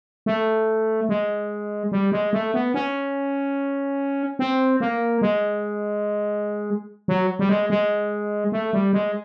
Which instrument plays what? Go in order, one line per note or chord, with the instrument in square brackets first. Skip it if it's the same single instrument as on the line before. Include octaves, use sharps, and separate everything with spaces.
[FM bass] A3
G#3
G3
G#3
A3
B3
C#4
C4
A#3
G#3
F#3
G3
G#3
G#3
A3
G3
G#3